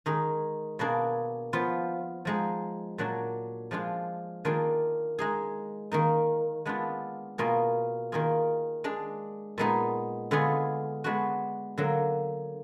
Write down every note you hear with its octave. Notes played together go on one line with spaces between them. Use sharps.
D#3 G#3 D#4 G#4
B2 A#3 D4 G#4
F3 B3 F4
F3 G#3 D#4
A#2 F#3 D4 F#4
F3 G#3 D4 F4
D#3 A#3 D4 F4 G#4
G#3 D#4 G#4
D#3 A#3 D#4
G#3 B3 D4 F4
B2 A#3 F4 G#4
D#3 A#3 F4 G#4
G#3 D4 G#4
A#2 G#3 B3 D#4 G#4
D3 G#3 B3 F4 G#4
G#3 B3 D4 F#4
D3 F#3 A#3